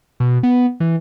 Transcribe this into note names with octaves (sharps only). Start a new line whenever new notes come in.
B2
B3
E3